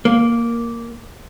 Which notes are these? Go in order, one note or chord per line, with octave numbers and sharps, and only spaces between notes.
A#3